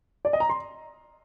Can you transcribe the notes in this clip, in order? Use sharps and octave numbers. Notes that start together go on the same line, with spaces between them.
D5
D#5
A#5
C6